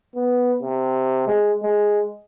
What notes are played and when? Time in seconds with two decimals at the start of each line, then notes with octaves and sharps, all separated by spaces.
0.16 B3
0.63 C3
1.27 G#3
1.63 G#3